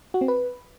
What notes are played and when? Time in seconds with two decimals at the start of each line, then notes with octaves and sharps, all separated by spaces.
0.14 F#4
0.21 C4
0.28 B4